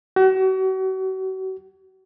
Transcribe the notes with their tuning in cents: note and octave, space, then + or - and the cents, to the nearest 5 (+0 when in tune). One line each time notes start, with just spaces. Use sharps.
F#4 +40